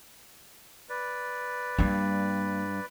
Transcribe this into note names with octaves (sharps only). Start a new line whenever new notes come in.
B4 D5
G2 G3 A#3